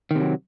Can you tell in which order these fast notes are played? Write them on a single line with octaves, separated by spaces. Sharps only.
D#3 C3 F#3